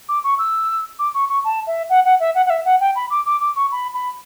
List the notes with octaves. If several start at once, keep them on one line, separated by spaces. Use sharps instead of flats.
D6
C#6
E6
D6
C#6
C#6
A5
E5
F#5
F#5
E5
F#5
F#5
E5
F#5
G5
B5
D6
D6
D6
C#6
B5
B5